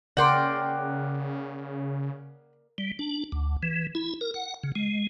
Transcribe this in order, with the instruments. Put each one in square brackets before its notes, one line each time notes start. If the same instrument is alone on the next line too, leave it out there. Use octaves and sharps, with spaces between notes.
[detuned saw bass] C#3 [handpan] A#4 D5 [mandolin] F#5 G5 C6
[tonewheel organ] G3
D4
D2
E3
E4
A#4
F#5
C#3
G#3